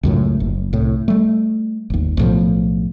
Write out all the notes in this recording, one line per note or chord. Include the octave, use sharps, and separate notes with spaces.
C#2 F#2 A2
F#1
C2 A2
G3 A3
G1 D#2
B1 A2 F3